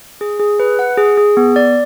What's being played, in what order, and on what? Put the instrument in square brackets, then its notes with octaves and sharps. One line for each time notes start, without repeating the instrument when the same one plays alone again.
[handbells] G#4
G#4
B4
F#5
G#4
G#4
B3
D5